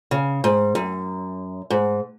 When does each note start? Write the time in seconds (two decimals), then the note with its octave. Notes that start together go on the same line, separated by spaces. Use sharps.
0.11 C#3
0.44 G#2
0.75 F#2
1.70 G#2